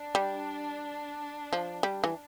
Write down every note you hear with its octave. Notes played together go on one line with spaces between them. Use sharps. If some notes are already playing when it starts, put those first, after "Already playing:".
Already playing: D4
G3
F3
G3
E3